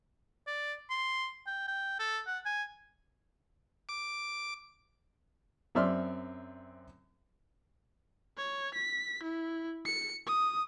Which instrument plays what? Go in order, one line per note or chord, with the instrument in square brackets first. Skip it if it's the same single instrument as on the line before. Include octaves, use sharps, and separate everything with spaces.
[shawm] D5
C6
G5
G5
A4
F#5
G#5
[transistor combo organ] D6
[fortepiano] F#2 C4 D5 E5 C6 F6
[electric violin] C#5
B6
E4
C#7
D#6